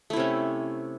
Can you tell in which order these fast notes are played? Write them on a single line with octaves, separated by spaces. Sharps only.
A3 E4 C3 C#4